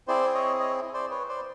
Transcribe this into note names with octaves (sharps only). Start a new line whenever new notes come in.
C4 E4 G#4 C5 D5
C#5 D#5
C#5 D#5
C5 D5
B4 C#5
C5 D5